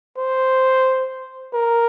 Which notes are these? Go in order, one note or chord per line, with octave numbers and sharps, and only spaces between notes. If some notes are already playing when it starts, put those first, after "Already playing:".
C5
A#4